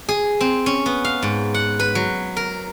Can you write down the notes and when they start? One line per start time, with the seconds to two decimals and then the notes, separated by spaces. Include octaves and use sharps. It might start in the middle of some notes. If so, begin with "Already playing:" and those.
0.09 G#4
0.41 C4
0.66 C#4
0.86 B3
1.05 F5
1.22 G#2
1.54 F#5
1.80 B4
1.95 F#3
2.37 A#4